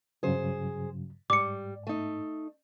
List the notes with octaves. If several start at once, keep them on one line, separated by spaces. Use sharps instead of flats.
G2 C#3 F#3 G#4 C5
G#2 G3 D6 C#7
A3 D#4